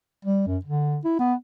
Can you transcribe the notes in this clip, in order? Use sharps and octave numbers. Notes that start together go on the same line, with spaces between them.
G3
F#2
D3
E4
B3